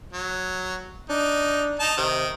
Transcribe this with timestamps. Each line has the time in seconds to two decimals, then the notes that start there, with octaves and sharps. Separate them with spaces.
0.13 F#3
1.10 D4 D#4
1.80 D#4 A5
1.98 C3 D#3